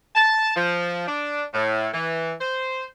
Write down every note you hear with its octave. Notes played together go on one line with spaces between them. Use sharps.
A5
F3
D4
A2
E3
C5